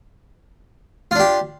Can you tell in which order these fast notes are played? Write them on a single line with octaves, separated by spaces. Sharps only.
F4 D4 G4